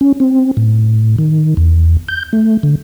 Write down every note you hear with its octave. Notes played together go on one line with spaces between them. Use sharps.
C#4
C4
A2
D#3
E2
G6
A3
D3